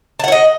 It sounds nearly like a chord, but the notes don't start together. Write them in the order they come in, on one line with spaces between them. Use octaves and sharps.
A5 F#5 C#5 D#5